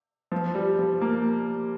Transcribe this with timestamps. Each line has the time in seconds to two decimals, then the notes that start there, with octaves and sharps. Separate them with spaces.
0.32 F3
0.55 G3
0.79 F3
1.01 A#3